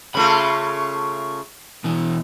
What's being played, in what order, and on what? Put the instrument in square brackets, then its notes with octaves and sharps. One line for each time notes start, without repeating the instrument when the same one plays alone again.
[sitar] C#3 A3 F4 [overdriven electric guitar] B5
[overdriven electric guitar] B2 E3